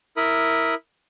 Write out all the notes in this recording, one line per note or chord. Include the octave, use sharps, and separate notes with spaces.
E4 A#4 B5 D#6